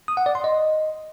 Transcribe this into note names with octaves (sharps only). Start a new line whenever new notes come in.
D#6
F#5
D5
C6
D#5